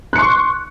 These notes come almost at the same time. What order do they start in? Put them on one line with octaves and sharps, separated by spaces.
F#6 C#7 C6 C#6